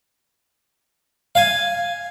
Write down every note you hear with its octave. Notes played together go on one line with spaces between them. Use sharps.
F5 G#5